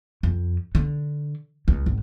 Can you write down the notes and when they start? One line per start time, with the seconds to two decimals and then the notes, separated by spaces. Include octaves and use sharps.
0.23 F2
0.75 D3
1.68 C#2
1.86 G#1